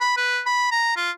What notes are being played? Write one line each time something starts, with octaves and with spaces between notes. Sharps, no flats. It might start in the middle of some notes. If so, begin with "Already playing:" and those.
B5
B4
B5
A#5
F4